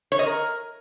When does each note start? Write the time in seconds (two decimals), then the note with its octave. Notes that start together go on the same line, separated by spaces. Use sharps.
0.12 C#5
0.19 D#5
0.26 A#4